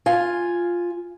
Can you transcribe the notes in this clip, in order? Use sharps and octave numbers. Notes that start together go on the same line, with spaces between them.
F4 G#5